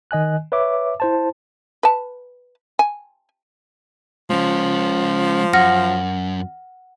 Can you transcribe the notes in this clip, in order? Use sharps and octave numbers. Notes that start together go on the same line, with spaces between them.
D#3 D#5 G#5 F#6
B4 C#5 E5 D6
E4 C5 A5
B4 A5
G#5
F3 G#3 C#4
F#2 F#5 F6 A#6